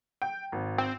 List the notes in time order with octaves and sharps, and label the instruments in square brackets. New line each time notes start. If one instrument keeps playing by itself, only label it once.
[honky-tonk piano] G5
G#1
[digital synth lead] C4